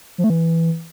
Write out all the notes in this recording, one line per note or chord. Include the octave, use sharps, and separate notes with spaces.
F3
A3
E3